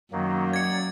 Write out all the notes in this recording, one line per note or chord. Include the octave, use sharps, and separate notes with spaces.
F#2 D#3 F#3 A#3
D5 G#6 C#7